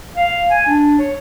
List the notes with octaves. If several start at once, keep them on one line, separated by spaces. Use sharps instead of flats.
F5
G#5
D4
C#5